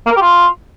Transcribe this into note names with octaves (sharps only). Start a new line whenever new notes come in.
A#3
A#4
G4
F4